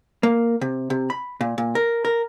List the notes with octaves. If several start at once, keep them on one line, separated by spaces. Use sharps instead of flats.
A#3
C3
C3
B5
A#2
A#2
A#4
A#4